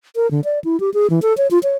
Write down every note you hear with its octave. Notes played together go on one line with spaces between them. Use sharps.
A#4
D3
D5
E4
G4
G#4
E3
A4
C#5
F4
C#5